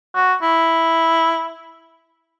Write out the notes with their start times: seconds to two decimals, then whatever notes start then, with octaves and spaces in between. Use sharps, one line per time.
0.15 F#4
0.42 E4